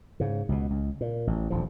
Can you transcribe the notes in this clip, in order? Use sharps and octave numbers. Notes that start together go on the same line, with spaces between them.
G#2 C#3
C#2 B2
C#2
A#2
A1
D#1 D2 F3